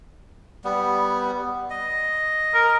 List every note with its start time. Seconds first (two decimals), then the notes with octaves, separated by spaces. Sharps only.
0.64 G3 B3
1.70 D#5
2.54 A#4